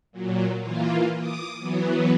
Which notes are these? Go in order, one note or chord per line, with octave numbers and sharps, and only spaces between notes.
A#2 F#3
E3 A#3 F4
D6 D#6
E3 F#3 B3